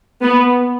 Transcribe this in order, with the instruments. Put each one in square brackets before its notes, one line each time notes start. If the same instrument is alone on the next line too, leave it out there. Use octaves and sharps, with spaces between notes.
[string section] B3